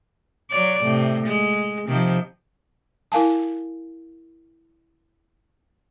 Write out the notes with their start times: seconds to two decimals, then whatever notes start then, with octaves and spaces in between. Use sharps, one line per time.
0.51 F#3 C#5 D5
0.82 A2 C3
1.27 G#3
1.88 C3 D#3 F3
3.12 E4 A#4 F5 G#5 A5